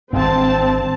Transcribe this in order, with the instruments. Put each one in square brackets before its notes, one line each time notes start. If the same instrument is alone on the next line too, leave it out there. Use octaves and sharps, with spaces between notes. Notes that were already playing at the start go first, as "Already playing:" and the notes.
[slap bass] G#1 G2 [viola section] C4 A5